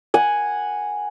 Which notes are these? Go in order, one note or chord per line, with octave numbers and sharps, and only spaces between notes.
F#5 G#5